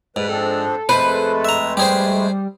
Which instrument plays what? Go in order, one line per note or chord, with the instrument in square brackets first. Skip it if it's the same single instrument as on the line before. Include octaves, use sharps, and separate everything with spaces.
[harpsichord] G#2 [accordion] G3 B4
[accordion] F3 C4 D4 [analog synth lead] A4
[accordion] F2 G#3 A3 [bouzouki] B4 [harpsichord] C5
[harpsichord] E5 A#5
[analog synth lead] G3 [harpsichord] G4 G#4 C5